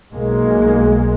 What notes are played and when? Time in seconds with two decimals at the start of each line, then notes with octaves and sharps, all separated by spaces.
0.14 B1 G#3 A#3